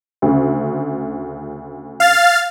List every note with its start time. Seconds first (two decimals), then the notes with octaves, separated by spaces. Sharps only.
0.22 D2 C#3
2.00 F5 F6 A6